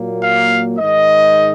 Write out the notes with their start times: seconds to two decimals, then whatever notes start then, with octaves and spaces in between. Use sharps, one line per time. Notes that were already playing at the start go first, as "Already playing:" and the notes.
Already playing: A#2 F#3 A#3
0.23 F5
0.79 G#2 D#3 G#3 D#5